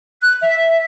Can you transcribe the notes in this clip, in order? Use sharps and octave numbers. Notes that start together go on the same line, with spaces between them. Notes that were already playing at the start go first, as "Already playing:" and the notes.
F#6
E5